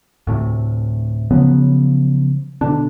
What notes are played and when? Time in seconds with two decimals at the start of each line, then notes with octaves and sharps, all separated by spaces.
0.27 D2 A2 C3
1.31 C#3 F3 F#3 B3
2.61 B2 D3 D4